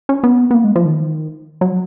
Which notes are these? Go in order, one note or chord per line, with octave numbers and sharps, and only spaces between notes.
C#4
B3
B3
A#3
G#3
F3
D#3
F#3